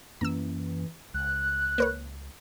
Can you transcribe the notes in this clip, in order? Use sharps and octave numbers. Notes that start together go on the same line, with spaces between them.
F#2 E3 A#3 C#4 A#5 E6
C#2 F#6
A#3 B4 C#5